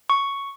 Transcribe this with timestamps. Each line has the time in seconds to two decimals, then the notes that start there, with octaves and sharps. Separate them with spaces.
0.10 C#6